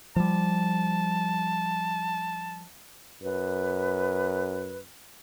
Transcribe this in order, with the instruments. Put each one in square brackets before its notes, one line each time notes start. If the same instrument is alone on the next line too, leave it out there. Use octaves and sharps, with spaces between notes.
[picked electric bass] F3 G3 [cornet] A5
[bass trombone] F#2 [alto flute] B4